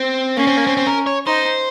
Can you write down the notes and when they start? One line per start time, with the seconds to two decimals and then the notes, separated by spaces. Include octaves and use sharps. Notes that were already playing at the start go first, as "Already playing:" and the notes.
Already playing: C4
0.37 A#3 C#4
0.47 C4
0.57 A#3
0.67 C4
0.77 C4
0.87 A#4
1.06 C#5
1.26 D#4 C5